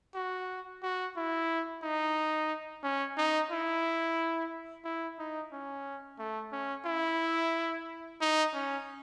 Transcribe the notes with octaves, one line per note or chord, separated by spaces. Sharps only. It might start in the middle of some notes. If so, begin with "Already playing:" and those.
F#4
F#4
E4
D#4
C#4
D#4
E4
E4
D#4
C#4
A3
C#4
E4
D#4
C#4